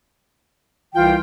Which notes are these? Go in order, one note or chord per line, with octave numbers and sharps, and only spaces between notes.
C2 E3 F4 G5